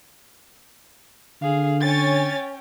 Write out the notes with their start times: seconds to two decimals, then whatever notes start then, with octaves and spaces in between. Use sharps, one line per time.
1.42 D3 G#4 F5
1.81 C#4 C#5 G5 G#5 A6